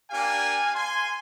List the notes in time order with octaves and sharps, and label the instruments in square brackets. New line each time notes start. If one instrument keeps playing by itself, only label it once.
[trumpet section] A#3 D4 G4 F5 G#5
G#5 C6